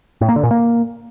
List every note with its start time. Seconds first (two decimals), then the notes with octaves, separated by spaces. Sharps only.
0.21 A2
0.29 A#3
0.36 D3
0.43 A#2
0.51 A#3